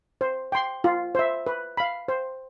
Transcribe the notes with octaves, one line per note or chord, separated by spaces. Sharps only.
C5
G5 C6
F4
C5 E5
B4
F5 B5
C5